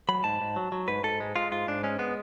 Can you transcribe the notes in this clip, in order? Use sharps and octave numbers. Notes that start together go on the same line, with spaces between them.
F#3 B5
G#2 A5
G#2
F#3
F#3
G#2 B4
G#2 A4
G#3
G#3 F4
G#2 F4
G#2 D4
G#3 C#4
G#3 B3